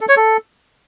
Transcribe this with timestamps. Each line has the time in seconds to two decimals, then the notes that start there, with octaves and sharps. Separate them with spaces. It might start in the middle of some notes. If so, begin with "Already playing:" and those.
0.01 A4
0.09 C#5
0.17 A4